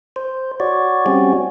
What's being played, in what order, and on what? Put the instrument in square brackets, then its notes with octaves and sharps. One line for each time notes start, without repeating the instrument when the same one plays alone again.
[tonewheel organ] C5
F#4 C#5 D5
G3 C4 C#4 F#4